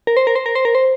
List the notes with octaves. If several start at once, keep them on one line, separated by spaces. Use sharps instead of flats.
A#4
C5
A#4
C5
A#4
C5
A#4
C5